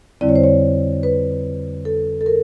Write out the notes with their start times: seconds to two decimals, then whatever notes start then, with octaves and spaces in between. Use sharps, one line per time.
0.21 F2 D3 G3 C4 E4 D5
0.29 C#5
0.36 C5
0.44 C#5
1.03 B4
1.85 A4
2.21 A4
2.26 A#4